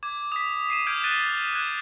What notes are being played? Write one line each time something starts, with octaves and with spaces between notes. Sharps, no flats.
D6 G#6
D#6 B6
D6 C7 D#7 E7
F6 G6 G#6 D7 F7
F#6 A6 D#7 G7
F#6 G#6 E7